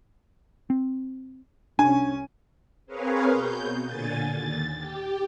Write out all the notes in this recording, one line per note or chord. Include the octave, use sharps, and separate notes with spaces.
C4
C2 C#4 D4 G#5
C4 G#4 A#4 B4 C#5 F5
B2 G6
A#2 D3 G#5 A6
D#2 A6
G4